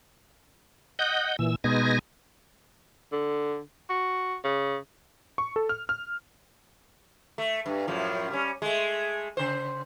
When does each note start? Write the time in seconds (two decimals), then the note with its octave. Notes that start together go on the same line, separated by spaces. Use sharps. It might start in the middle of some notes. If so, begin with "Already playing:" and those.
0.99 D#5 F#5 G6
1.39 A#2 E3 E6
1.64 B2 G#3 B3 D#4 G#5 A#6
3.12 D3
3.90 F#4
4.44 C#3
5.38 C#6
5.56 A4
5.69 F6
5.89 F6
7.38 A3
7.66 G2
7.87 F#2 A2 F3
8.31 G3 C#4
8.62 G#3 A3
9.37 C#3 C5